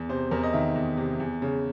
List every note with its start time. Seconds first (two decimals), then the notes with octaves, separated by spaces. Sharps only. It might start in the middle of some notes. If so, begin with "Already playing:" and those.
Already playing: E2
0.09 C3 C5
0.31 E2 A#4
0.43 D#5
0.53 D#3 E5
0.76 E2
0.98 C3
1.20 E2
1.42 C#3